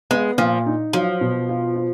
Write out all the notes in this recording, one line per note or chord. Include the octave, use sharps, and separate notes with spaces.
G#3 B3
A#2 F3
D#4
F3 F#3
B2
F4
F4